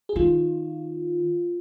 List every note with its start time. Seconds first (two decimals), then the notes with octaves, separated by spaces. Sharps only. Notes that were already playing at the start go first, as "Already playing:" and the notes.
0.09 G#4
0.16 D#3 F4